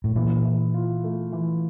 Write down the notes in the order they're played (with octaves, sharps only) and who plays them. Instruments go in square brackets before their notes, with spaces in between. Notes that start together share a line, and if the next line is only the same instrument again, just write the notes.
[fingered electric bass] A2
[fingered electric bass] A#2 [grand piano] E3
[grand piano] E3
F4
A3
E3